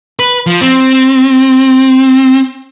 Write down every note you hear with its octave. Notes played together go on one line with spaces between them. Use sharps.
B4
F3
C4